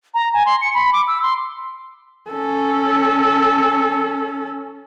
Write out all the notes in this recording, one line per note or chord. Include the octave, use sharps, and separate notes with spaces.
A#5
G#5
C6
C#7
B5
D6
E6
C6
C#4 A4